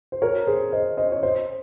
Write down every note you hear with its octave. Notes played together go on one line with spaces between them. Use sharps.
C5
A#4 C#5
G#4 C5
C5 D#5
C5 D#5
C#5
C5 D#5